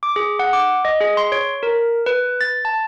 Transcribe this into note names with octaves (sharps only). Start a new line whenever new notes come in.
D6
G#4
F#5
D6
D#5
G#4
C6
C#5
A#4
B4
A6
A5